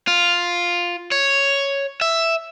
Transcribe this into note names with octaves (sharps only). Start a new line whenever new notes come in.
F4
C#5
E5